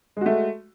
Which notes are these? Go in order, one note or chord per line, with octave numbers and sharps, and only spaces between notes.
G#3 A3 F#4